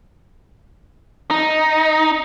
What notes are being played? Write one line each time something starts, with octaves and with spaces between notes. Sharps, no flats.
D#4